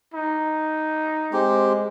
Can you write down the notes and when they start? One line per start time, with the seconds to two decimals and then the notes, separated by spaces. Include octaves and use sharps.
0.14 D#4
1.33 G#3 C4 G4